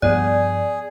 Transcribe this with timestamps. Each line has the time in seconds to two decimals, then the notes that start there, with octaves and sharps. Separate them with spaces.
0.02 G2 F3 G3 B3 G#4 D5